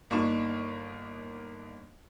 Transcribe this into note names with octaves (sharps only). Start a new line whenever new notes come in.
G1 A#3 D4 D#4 C#6 E7